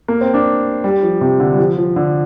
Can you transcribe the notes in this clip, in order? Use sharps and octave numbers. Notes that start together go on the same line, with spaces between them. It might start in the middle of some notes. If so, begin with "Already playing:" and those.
A#3
C4
D4
G3
F3
C3
D3
G3
F3
F3
D3